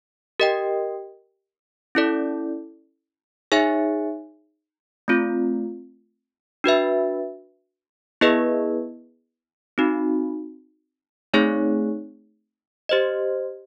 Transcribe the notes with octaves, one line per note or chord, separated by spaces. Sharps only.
G4 A#4 D#5 G5
C#4 E4 A4 D5
D#4 G#4 C#5 E5 G#5
A3 C4 F4
D4 F#4 B4 E5
B3 E4 G#4 B4 D#5
C4 D#4 F#4
A3 C4 D#4 G#4 C#5
G4 C5 D#5